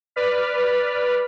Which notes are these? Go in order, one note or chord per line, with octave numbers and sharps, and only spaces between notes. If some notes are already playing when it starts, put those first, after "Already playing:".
B4 D5 F6 B6